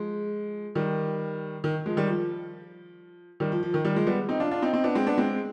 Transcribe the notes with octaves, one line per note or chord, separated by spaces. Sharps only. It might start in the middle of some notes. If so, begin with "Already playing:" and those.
Already playing: F3 G#3
D#3 G3
D#3
F3 G#3
D#3 G3
F3
D#3 G3
F3
F3
D#3
D#3 G3
F3 G#3
G3 B3
C4 D#4
D4 F4
D4 F4
C4 D#4
C4 D#4
B3 D4
G#3 C4
B3 D4
G#3 C4